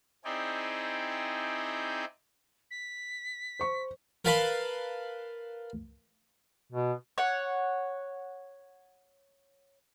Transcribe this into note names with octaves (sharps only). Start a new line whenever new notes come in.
C4 D#4 E4 G#4 D5 G5
B6
C5 C#6
A#4 B4 F5 A5 B5 C6
B2
C#5 F#5